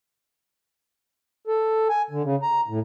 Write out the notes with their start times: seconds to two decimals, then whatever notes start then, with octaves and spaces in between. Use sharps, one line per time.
1.48 A4
1.89 G#5
2.11 D3
2.23 C#3
2.42 A#5
2.68 A2